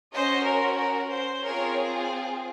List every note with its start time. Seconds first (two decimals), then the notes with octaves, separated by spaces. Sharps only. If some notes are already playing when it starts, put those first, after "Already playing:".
0.14 C#4 F#4 C5 D#5
0.46 A#4 C#5
0.79 A#4
1.11 C5
1.44 C4 F4 G#4 A#4 C#5